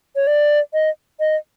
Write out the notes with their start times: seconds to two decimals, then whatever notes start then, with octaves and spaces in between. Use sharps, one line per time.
0.16 C#5
0.27 D5
0.73 D#5
1.20 D#5